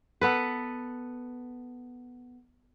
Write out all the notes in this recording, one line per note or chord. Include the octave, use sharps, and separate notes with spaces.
B3 A4 B4